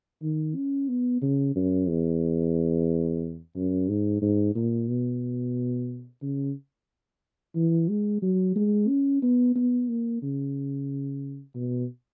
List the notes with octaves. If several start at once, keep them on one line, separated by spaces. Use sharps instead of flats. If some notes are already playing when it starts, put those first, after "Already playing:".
D#3
C#4
B3
C#3
F#2
E2
F#2
G#2
G#2
A#2
B2
C#3
E3
G#3
F#3
G#3
C#4
B3
B3
A#3
C#3
B2